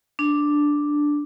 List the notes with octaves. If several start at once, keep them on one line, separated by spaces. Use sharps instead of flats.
D4